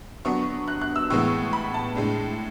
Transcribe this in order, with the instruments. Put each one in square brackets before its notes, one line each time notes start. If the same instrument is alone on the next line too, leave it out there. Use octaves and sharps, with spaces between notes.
[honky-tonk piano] D3 F#3 B3 D4 C#6
F#6
F#6
E6
A2 E3 G#3 B3 C#6
B5
A5
A2 G#3 D4